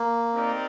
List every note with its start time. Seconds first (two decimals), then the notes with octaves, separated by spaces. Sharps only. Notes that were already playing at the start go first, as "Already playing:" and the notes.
Already playing: A#3
0.35 C4 D#4 G4 A#4 D5